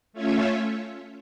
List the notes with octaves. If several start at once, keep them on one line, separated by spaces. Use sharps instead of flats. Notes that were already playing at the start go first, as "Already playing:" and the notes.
A3 C#4 F4 C#5 E5